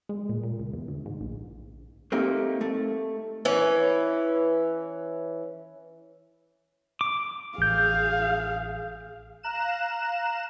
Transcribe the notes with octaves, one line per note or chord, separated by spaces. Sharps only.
G#3
A#2
A#2
C#2
E2
D2
G#2
A#1
A3 A#3 C4 D#4 G4
A3
E3 C#4
D6
A1 G#4 F5 G6
F5 A#5 F#6 E7